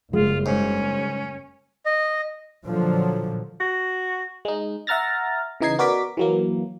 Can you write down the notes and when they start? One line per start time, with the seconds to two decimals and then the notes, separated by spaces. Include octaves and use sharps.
0.13 F#1 G2 G#3 F4
0.46 G#2 C#4
1.86 D#5
2.66 A#2 D3 F3 F#3
3.60 F#4
4.45 G#3 D#4
4.87 E5 F#5 A#5 F6 A6 A#6
5.61 C#3 E3 D#4 D#5 G#6 C7
5.79 B3 F#4 A#4 D5 D6 B6
6.17 E3 F#3 A#3